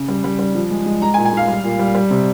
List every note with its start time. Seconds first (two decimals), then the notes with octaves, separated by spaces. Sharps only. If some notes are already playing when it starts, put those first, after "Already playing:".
Already playing: C#3
0.08 G3
0.24 G3
0.39 G3
0.55 F3
0.70 G#3
0.86 G#3
1.02 G#3 A#5
1.14 G#5
1.18 A#2
1.25 G#5
1.33 G#3 F5
1.48 G3
1.64 A#2
1.79 G3
1.95 G3
2.10 C3